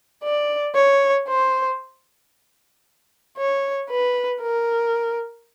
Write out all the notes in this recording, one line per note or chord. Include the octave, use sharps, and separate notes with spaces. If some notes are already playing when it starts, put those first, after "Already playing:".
D5
C#5
C5
C#5
B4
A#4